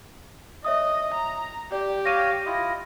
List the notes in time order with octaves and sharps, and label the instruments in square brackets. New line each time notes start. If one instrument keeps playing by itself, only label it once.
[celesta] C#5 E5 D#6 [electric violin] D#5
[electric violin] A#5
[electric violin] G4 [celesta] D5
[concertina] C#5 F5 [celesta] A#6 D#7
[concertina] E4 F4 D#5